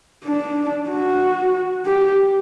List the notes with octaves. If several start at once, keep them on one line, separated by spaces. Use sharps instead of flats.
D4
F#4
G4